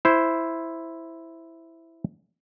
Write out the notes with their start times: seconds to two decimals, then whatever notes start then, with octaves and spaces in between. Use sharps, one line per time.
0.05 E4 C5